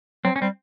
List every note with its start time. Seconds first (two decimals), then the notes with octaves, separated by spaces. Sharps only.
0.25 F#3 C4
0.36 C#4
0.41 G3 C4